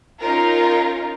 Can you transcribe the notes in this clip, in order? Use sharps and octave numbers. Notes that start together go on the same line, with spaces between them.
C#4 D#4 F4 A#4